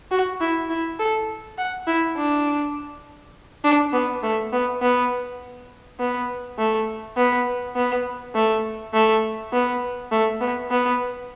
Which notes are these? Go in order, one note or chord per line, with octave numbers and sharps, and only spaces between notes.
F#4
E4
E4
A4
F#5
E4
D4
D4
B3
A3
B3
B3
B3
A3
B3
B3
A3
A3
B3
A3
B3
B3